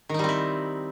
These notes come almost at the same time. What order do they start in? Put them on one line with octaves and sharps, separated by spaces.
D#3 D#4 G3 C4 E4